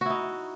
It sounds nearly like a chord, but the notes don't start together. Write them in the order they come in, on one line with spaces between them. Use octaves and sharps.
F#4 E4 D#4